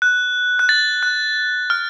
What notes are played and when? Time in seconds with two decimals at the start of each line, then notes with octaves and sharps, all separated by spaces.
0.02 F#6
0.59 F#6
0.69 A6
1.03 F#6
1.70 F6